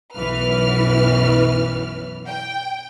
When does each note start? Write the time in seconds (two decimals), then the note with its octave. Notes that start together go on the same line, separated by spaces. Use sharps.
0.14 B1 F#2 E3 B4 F6
2.27 G5